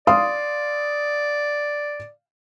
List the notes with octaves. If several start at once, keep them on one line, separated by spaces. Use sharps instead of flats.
D5 F5 C6 D#6